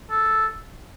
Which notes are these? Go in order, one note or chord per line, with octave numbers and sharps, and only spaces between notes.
A4